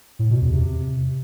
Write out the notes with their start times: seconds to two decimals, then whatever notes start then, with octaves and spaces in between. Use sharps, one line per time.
0.19 A2
0.30 B2
0.41 E2
0.53 C3